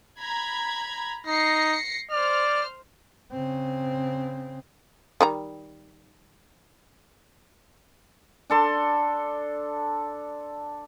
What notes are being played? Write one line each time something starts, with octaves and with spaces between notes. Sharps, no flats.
A#5 B5 G#6
D#4 A#6 C7 C#7
C5 D5 F6
C#3 C4
D#3 G3 A#5
D4 A4 C6